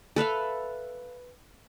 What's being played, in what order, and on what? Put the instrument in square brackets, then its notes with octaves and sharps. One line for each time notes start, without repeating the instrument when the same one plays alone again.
[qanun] A4 B4 E5 F5